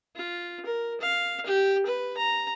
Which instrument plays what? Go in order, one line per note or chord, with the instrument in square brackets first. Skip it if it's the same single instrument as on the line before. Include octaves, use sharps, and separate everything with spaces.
[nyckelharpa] F4
A#4
F5
G4
B4
A#5